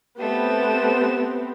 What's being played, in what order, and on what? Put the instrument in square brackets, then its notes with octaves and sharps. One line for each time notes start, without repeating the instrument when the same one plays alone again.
[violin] A3 E7 [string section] B3 C4 [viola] G4